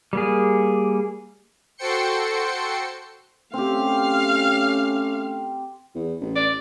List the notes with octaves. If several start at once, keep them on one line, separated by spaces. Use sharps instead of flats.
G3 A#3 G#4
F#4 A4 C5 G5 C6 C#7
A3 C4 C#4 G4 F5
E2
A1
D5